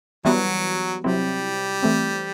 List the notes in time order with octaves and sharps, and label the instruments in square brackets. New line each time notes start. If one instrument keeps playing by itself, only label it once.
[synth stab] E3 G3 B3 F#4 [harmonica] F#3
[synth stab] C3 F#3 C4 E4 [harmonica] G3
[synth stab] E3 A3 C4